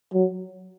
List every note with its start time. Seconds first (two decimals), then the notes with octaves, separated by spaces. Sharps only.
0.13 F#3